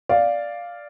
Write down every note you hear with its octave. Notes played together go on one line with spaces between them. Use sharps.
D5 F5